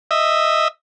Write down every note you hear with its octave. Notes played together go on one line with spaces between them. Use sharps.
D#5 E5